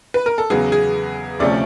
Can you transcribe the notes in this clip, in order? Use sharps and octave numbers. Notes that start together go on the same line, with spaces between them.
B4
A#4
A4
E2 C#3 F#3 B3 G#4
G#4
D2 C3 F3 A3 C#4 D5